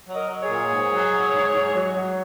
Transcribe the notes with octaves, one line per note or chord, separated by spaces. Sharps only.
F#3
A#4 D#5
F#3
G#4 C#5
A#2
G#2
F#3
F#3
G#2
G#2
F#3
F#3